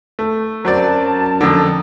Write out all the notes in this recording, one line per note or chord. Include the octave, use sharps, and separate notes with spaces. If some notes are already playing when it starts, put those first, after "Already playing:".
A3
F#2 F#3 C4 A#4 D5 A5
F2 D3